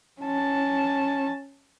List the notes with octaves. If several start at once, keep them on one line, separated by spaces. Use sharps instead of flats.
C#4 A5